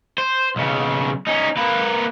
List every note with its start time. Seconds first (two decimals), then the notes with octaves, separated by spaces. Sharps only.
0.18 C5
0.56 B1 C#3
1.27 C#4 D#4
1.57 A#3 B4